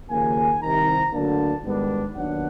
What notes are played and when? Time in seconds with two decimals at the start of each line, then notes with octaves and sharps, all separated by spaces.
0.10 D#2 C#3 F3 A#3 G#5
0.61 C2 C3 D#3 A#5
1.12 D2 D3 F#3 A#3 D4 A5
1.63 G#2 D#3 G3 B3 D4
2.15 D#2 D#3 F#3 B3 D4 F#5